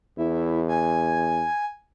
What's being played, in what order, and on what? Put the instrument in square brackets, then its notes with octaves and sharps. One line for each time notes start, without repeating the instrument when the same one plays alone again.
[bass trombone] E2 [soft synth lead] E4
[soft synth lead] G#5